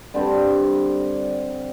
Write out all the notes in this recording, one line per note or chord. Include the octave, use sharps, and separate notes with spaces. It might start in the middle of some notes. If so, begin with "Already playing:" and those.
D3 G3 C4